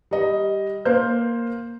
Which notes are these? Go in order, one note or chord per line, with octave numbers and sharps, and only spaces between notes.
G3 D#5
A#3 C5 G6